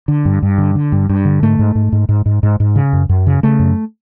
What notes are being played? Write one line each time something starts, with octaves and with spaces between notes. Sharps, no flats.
D3
G2
G2
D3
D3
G2
G2
D3
G#2 A3
G#2
G#2
G#2
G#2
G#2
G#2
G#2
C#3
F#2
F#2
C#3
C#3 A3
F#2